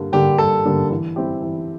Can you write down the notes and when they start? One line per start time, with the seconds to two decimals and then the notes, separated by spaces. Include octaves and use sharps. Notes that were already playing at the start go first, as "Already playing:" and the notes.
Already playing: G2 D3 G3 A#3 D4
0.12 D3 G3 A#3 D4 G4
0.38 G2 A4
0.65 D3 G3 A#3 D4
0.91 E3
1.16 G3 C4 E4 G4
1.42 E3